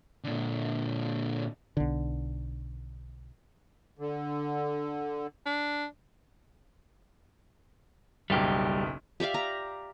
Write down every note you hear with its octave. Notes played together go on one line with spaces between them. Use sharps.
A#2 D3
B1 D3
D3
D4
F#1 B1 G3 G4
G4 D5 E5 F5
A#5